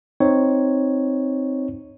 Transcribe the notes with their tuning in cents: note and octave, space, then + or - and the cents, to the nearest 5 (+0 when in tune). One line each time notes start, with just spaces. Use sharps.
C4 +0 D#4 +0 C#5 +0